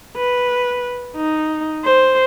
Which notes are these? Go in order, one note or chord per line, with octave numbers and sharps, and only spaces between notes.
B4
D#4
C5